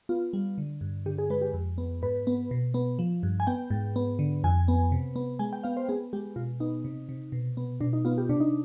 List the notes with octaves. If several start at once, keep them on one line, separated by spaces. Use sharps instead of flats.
B3 F4
G3
D3
G2
D3 G4
G#4
G#3 B4
G4
F2
B3
G#2 B4
B3
B2
B3
F3
G2
G#5
B3 G5
G#2
B3
D3
F2 G#5
B3
C3
B3
G#3 G#5
G5
B3 F5
C5
B3 G#4
G#3 G4
B2 F4
B3 D#4
C3
C3
B2
B3
B2 D4
D#4
B3 F4
G4
C3 D4
D#4